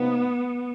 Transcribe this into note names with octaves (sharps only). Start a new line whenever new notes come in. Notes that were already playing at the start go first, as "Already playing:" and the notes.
Already playing: C3 F3 B3 C4 D#4